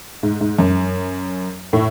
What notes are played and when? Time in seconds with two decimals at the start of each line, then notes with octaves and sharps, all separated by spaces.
0.23 G#2
0.41 G#2
0.59 F#2
1.73 A2